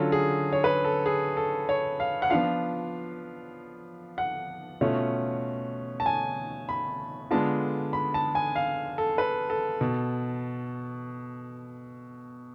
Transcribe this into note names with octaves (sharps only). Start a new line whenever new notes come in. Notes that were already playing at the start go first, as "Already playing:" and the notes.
Already playing: D3 F#3 C#4 F4 A4
G#4
C#5
B4
A4
G#4
A4
C#5
F5
F#5
F3 B3 D4 F4 F5
F#5
B2 A3 C#4 F4
A5
G#5
B5
D3 G#3 B3 D4 F4 A5
B5
A5
G#5
F5
A4
B4
A4
B2